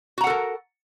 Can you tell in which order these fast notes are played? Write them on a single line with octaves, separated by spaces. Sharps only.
F#4 A#5 F#5 A4 A#4